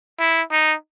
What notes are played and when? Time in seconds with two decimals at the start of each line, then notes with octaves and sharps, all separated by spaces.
0.19 E4
0.51 D#4